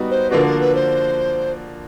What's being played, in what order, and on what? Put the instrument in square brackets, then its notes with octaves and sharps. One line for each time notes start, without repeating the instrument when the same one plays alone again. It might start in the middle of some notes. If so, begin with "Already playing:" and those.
Already playing: [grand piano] G3 B3 D#4 F#4
[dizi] C5
[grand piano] D3 F3 A#3 D4 F#4 [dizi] B4
[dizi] A#4
B4
C5